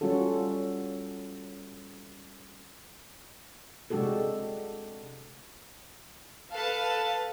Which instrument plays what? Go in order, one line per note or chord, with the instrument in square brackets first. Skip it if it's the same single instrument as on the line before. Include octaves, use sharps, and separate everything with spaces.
[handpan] G3 C#4 F4 F#4 A4
C3 G#3 D4 F#4 G4 A4
[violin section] A4 B4 F5 A5